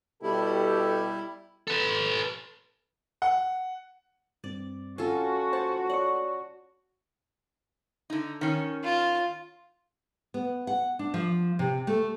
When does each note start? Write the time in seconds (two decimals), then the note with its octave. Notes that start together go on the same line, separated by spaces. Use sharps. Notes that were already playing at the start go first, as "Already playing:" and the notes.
0.23 B2 G3 E4 G4 A4
1.67 A4 B4
3.22 F#5
4.44 G2 C4 D5
4.98 C#4 F4 F#4 A4
5.53 C5 A5
5.90 C#5 D5 F#5 C#6
8.10 D3 D#4
8.41 D#3 C#4
8.84 F4
10.34 B3
10.67 F#5
10.99 D4
11.14 F3
11.59 C3
11.87 A3